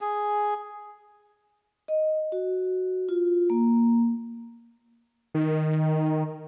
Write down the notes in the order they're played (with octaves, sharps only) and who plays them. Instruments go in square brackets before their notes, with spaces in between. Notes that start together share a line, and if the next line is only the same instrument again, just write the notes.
[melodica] G#4
[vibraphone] D#5
F#4
F4
A#3
[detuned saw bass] D#3